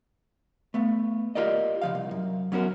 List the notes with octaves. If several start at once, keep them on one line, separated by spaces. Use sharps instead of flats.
A3 B3
F4 G4 A#4 D5 D#5
C#3 F3 F5
C2
F#2
F#3 B3 C#4 F#4 A#4